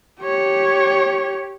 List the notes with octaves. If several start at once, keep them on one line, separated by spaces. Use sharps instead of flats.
G4 C#5